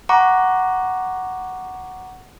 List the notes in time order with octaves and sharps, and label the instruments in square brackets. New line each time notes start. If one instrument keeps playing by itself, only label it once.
[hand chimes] F#5 A#5 C#6 D6